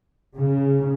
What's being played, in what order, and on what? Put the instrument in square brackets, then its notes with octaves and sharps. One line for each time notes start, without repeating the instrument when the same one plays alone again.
[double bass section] C#3